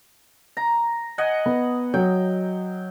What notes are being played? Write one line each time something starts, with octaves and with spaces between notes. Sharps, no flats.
A#5
D#5 F#5 G#5
B3
F#3 G5